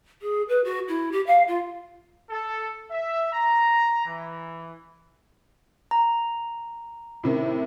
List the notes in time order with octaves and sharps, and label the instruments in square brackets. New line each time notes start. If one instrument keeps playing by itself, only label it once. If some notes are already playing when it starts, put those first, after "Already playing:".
[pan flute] G#4
B4
F#4
E4
G4
F5
F4
[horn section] A4
E5
A#5
E3
[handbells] A#5
[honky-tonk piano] A2 C3 D#3